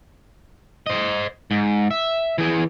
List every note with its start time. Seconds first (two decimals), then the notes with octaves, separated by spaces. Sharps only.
0.87 C5 D#5
1.51 G#2
1.91 E5
2.38 E3 G#4